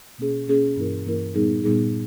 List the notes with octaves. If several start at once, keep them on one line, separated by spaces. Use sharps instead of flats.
B2 A#3 C#4 G#4
B2 A#3 C#4 G#4
G2 E3 A#3 E4 A#4
G2 E3 A#3 E4 A#4
A#2 G3 B3 D#4 G#4
A#2 G3 B3 D#4 G#4